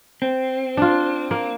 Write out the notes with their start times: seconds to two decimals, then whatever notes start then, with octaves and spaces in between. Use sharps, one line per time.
0.22 C4
0.77 D4 F4
1.31 A#3